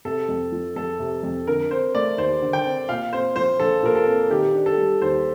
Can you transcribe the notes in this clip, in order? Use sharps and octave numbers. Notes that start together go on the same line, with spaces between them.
C3 A4
F2
F3
F2 A4
C3
F2
D3 A#4
C4 C5
A3 D5
D#2 C5
D3
G5
C4
A#2 F5
C4 C5
F3 C5
A#1 A4
A#2 A#4
A4
C4
D#3 G4
D4
A4
G3
D#2 C5